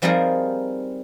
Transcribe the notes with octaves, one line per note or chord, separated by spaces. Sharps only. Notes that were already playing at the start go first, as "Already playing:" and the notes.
F3 G3 C4 D#4 G#4 A#4